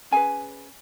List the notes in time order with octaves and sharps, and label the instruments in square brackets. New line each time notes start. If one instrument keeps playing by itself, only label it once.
[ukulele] C#4 G#4 B4 G#5